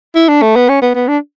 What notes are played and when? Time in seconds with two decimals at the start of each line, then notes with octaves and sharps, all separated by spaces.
0.15 E4
0.29 D4
0.42 A3
0.56 B3
0.69 C#4
0.82 B3
0.95 B3
1.08 D4